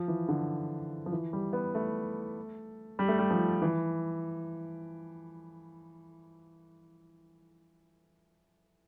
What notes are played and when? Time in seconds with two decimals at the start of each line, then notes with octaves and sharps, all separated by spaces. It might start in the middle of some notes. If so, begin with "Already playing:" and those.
Already playing: F3
0.08 E3
0.28 D3
1.06 F3
1.12 E3
1.33 G3
1.53 B3
1.75 A3
2.99 G3
3.08 A3
3.19 G3
3.31 F3
3.62 E3